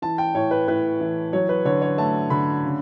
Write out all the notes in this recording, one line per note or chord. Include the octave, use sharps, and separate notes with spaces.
E3 A5
G5
A2 C#5
B4
A2 B4
E3
F#3 C#5
B4
D3 C#5
C#5
A3 A5
D3 B5
C#3